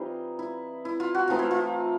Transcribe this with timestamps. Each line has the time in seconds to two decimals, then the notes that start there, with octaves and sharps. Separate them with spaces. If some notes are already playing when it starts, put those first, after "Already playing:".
Already playing: E3 G3 C4 D#4 F4
0.39 E4
0.85 E4
1.00 F4
1.15 F#4
1.28 E3 A3 C4 D#4 F4
1.39 E4
1.51 F4